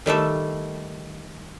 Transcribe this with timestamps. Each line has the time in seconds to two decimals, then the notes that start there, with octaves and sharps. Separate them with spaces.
0.06 D#3 G3 A3 A4